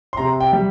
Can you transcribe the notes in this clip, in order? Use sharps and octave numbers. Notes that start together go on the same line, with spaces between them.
C6
C3 A#5
G5
G3